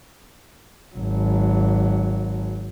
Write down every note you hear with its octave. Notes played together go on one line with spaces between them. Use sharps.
G#1 F#3